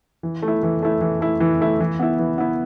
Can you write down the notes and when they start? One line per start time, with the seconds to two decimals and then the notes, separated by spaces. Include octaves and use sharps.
0.23 E3
0.42 A3
0.48 E4
0.63 E3
0.82 A3 E4
1.01 E3
1.21 A3 E4
1.40 E3
1.61 A3 E4
1.80 E3
2.00 B3 E4
2.19 E3
2.38 B3 E4